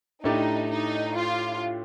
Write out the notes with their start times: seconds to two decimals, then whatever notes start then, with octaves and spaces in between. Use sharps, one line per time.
0.24 A2 A3 D4 D#4 G4
0.70 D#4
1.17 F4